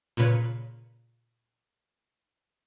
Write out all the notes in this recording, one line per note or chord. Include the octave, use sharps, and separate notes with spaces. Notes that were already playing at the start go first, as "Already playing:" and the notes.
A#2 C#3 B4 C#5